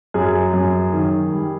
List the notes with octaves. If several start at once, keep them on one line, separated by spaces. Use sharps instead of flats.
F#2 G#4
F#2
D#3
G3